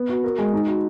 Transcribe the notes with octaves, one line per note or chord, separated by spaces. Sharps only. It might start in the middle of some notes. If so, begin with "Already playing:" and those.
Already playing: B3
F#4
A#4
G#3
D#4
F#4